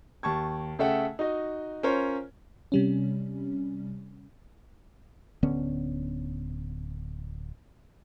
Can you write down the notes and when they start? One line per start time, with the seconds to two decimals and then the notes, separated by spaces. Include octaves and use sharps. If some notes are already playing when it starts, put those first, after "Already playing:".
0.23 D#2 A5 C#6 G#6
0.79 C#3 A3 A4 E5 F#5 G5
1.19 D#4 F#4 D#5
1.83 C#4 F4 A#4 C5 C#5
2.72 C3 G3 C#4
5.43 D1 D3 B3 C#4